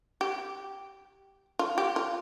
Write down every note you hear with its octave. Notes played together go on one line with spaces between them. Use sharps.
G4
F4
G4
F4